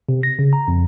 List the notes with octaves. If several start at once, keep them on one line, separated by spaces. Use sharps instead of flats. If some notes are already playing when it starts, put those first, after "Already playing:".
C3
A#6
C#3
A#5
F2